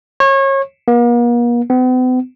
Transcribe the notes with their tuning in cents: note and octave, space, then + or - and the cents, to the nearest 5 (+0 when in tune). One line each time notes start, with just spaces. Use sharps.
C#5 -30
A#3 +45
B3 +45